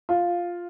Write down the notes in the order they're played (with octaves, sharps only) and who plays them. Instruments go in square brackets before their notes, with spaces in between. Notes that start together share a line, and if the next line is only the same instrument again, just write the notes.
[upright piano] F4